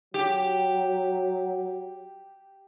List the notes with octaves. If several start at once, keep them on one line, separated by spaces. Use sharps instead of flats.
F#3 G4